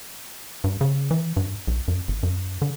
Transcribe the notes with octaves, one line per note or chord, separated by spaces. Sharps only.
G2
C#3
E3
G2
B1
F#2
G#1
F#2
D3